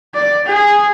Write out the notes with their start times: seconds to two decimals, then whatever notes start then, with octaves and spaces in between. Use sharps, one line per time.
0.15 D5
0.46 G#4